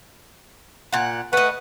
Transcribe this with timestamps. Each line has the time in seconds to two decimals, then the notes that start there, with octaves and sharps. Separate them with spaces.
0.93 A#2 F#5
1.33 A3 B4 D#5 F#5